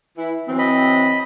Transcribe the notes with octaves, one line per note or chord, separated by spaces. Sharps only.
E3 E4
E3 F#3 C4
D#5 B5